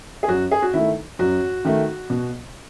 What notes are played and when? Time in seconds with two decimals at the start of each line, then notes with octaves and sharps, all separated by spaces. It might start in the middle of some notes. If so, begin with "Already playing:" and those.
0.23 G#4
0.28 F#2 F#4
0.51 G#4
0.62 F#4
0.73 D#3 A3 E4
1.19 F#2 F#4
1.65 D#3 A3
2.10 B2